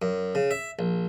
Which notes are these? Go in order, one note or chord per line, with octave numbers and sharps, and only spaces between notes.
F#2
C#3
E5
A#1